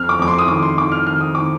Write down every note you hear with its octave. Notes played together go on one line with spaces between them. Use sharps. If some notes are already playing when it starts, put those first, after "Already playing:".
Already playing: F2 F6
D6
F2 D6
C6
D#6
D#3 D6
C6
D#3 D6
F6
D#3 F6
D#6
D#3 D6